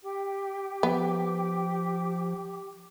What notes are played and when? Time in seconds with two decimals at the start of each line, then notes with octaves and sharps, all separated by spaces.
0.02 G4 G5 D6
0.83 F3 B3